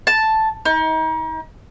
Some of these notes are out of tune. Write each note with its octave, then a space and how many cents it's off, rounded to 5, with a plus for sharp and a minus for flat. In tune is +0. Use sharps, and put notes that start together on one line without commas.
A5 +0
D#4 +35